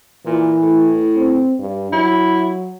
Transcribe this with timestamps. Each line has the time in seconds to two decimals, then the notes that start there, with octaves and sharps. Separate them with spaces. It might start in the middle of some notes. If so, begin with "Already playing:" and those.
0.26 A#2 E3
0.61 A2
1.16 C4
1.59 G2
1.92 F#3 E4